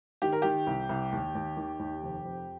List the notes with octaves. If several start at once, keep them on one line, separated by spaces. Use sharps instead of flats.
D#3 G4
A#4
D#3 G4
C2
C2
D#2
D#2
D#3
D#2
F1
F2